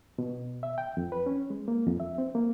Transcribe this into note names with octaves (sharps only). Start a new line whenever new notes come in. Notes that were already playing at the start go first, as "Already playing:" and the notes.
B2
E5
G5
F2
B4
C#4
G#3
A#3
F2
E5
C4
A#3